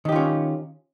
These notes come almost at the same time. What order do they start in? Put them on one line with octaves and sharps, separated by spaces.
D#3 G4 F4 C#4